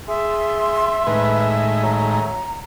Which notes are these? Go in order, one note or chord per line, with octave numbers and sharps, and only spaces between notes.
G#4 E5 C6
A2 D#3 G#3 B4
F#3 A#5